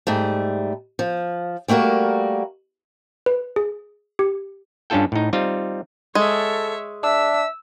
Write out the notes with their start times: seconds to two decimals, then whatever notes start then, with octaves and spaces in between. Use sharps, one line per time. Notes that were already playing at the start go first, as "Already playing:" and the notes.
0.07 G#2 G3 A3
0.99 F3
1.68 G3 A3 A#3 F#4 A#4
3.26 B4
3.56 G#4
4.19 G4
4.90 G2 C#4 D4 F4 A4 G5
5.12 A2 D#4
5.33 G3 C4 D#4 F4
6.15 G#3 A4 C#5 E5
7.03 D4 E5 E6